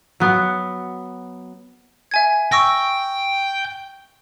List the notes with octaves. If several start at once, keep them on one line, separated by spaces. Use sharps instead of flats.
F#3 B3
E5 G#5 G#6
G5 C#6 E6 A#6